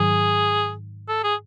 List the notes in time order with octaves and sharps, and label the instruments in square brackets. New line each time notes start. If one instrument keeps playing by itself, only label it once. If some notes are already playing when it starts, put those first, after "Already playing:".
Already playing: [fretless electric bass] G#2 D#3 F#3 [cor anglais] G#4
[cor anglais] A4
G#4